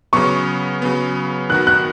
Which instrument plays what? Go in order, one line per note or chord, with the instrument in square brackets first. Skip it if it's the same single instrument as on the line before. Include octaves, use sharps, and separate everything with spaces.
[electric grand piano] C#3 F#3 B3 [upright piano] C#6
[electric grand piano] C#3 F#3 B3
[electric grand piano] D#3 B3 F#4 [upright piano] F#6
[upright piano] F#6